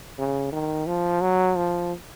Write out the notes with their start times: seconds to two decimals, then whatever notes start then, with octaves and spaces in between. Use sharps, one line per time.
0.19 C#3
0.52 D#3
0.87 F3
1.21 F#3
1.56 F3